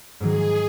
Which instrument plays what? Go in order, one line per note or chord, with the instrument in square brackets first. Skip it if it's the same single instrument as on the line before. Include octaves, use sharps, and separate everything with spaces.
[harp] G#2 D#3 F#3 [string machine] G#4